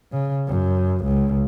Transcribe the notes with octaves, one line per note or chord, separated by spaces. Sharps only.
C#3
F#2
C#2